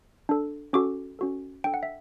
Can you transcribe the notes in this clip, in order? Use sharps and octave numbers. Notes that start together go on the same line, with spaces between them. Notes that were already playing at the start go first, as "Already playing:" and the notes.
D4 A4
C#4 F#4 A4 D6
C#4 F#4 A4
D4 A4 G5
F#5
E5